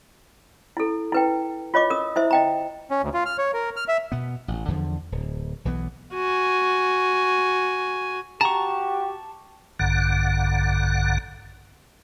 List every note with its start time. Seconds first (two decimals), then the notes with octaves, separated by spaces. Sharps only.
0.77 E4 A4
1.12 E4 B4 G5
1.74 F4 C#5 D#5 D6
1.90 A#4 D#6
2.16 E4 C5 E5
2.31 D#5 G5 A#5
2.91 C#4
3.02 D2
3.14 F4
3.26 F6
3.38 C#5
3.54 A#4
3.76 F6
3.88 E5
4.12 B2 B3
4.48 A1
4.68 E2 D3 F3
5.12 D1
5.65 B1 E3 G#3 B3
6.13 F#4 G#5
8.41 F#4 G4 A5 A#5 C#6
9.79 A#1 G2 D3 F#5